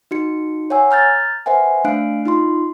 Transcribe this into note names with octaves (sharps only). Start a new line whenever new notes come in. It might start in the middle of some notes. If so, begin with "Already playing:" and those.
D#4 F#4 C#7
C#5 F#5 G#5 E6
A#5 F6 G6 A6
B4 C5 E5 F#5 G#5
A3 D4 F5 F#6 C7 D7
D#4 F4 C6